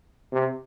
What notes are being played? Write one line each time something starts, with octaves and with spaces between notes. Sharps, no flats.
C3